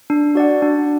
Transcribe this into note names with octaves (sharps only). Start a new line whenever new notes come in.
D4
F#4 D5 F#5
D4